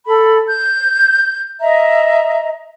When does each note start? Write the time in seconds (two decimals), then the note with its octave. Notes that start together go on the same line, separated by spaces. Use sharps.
0.07 A4 B5
0.47 G6
1.60 D#5 E5 A#5